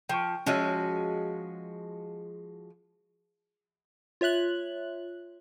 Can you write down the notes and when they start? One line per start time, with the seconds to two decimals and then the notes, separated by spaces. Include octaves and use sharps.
0.09 F3 G5 C#6
0.46 F3 G#3 C#4 F#4 D#5 E5
4.21 F4 C#5 E5 F#6 F#7